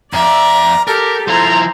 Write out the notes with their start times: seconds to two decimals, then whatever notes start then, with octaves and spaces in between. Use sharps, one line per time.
0.13 F2 D5 E5 A#5
0.88 G4 A4 A#4
1.28 F3 E4 C5 A#5